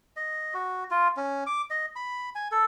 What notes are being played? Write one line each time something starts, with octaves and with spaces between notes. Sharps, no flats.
D#5
F#4
F4
C#4
D6
D#5
B5
G#5
A4